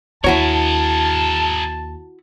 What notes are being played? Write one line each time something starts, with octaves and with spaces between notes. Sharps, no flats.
D#2 D4 E4 F#4 G#4 A#4 C#5 A5